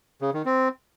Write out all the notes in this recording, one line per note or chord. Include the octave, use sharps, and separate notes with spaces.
C#3
D#3
C4